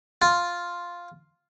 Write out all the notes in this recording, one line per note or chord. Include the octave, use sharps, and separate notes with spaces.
F4